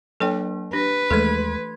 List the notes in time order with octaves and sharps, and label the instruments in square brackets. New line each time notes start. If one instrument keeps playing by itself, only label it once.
[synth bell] F#3 A#3 D4 [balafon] A4 C#5 G5
[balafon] D4 [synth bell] G4 [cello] B4
[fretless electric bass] D#2 G#3 [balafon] E3 A3 A4 [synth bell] C6 G#6